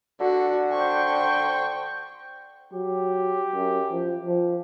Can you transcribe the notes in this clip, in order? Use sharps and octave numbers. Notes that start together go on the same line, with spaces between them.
D3 F#4
C5 G5 C#6
F#3 G4
F#2
F3
F3